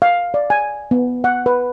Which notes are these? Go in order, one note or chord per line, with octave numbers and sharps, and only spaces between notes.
F5
D5
G#5
B3
F#5
B4